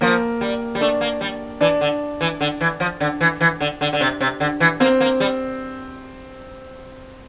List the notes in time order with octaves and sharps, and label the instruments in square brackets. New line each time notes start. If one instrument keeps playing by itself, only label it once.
[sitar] F3 [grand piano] A#3
[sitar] G3
G3
[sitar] A3 [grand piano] D4
[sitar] A#3
G3
[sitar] E3 [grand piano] D4
[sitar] D3
E3
D3
E3
F3
D3
E3
E3
D3
D3
D3
C3
C3
D3
E3
[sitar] A#3 [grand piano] C4
[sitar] A#3
G3